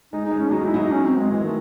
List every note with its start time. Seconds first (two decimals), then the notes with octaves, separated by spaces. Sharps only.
0.13 G#3 D#4
0.26 D#4
0.31 G#3
0.39 C#4
0.51 F#3 D#4
0.62 G#3 E4
0.74 F#3 D#4
0.91 C#4
1.04 C4
1.18 G#3
1.30 E3 G#3
1.40 D#3
1.43 A3